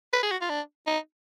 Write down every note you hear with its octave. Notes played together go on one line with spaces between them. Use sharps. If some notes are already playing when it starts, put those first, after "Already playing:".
B4
G#4
F#4
F4
D4
D#4